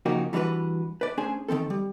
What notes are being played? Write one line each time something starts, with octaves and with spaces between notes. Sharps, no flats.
C#3 F3 A#3 D#4 F#4 G4
E3 G3 D4 F#4 B4
B4 D5
A3 C#4 D4 G#4 C5 G#5
D#3 F3 C4 A4
G3